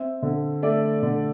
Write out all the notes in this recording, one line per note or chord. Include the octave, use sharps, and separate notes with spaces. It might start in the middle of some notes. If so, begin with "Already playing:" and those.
Already playing: C4 E5
D3
A3 D5
D3